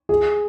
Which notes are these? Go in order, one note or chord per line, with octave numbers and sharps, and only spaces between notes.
G#4